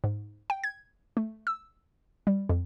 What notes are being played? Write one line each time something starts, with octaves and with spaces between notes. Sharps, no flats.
G#2
G5
G#6
A3
E6
G3
F2